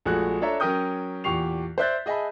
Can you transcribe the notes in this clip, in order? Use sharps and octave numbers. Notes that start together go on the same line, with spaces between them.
A#1 G#3 A3 F#4 G#5 F#6
D4 A4 C#5 E5 A#5
F#3 C#4 A#4 G5 D#6 G6
E2 A#2 G4 C#6 C7 F7
C5 D5 E5 F#6 G6 A6
G#4 D#5 E5 G#5 A5 B5